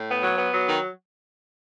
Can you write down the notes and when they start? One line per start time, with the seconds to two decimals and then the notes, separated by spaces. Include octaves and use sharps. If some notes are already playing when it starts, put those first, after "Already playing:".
Already playing: A2
0.09 B3
0.23 F#3
0.37 B3
0.53 F#3
0.67 D#3